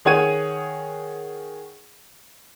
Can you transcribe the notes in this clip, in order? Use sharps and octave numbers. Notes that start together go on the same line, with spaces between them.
D#3 G#4 C#5 F#5 G#6 D#7